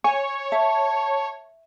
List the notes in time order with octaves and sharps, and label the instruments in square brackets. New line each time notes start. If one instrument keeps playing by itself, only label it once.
[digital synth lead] C#5 [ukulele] G#5
[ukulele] E5 [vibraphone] A5